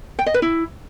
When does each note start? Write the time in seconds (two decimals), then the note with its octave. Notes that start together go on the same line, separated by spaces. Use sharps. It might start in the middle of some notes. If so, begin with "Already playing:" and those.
0.19 G5
0.26 D#5
0.34 B4
0.42 E4